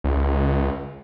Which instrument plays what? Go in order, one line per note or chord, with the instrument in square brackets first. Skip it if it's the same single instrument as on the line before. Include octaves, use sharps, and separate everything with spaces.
[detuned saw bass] C#2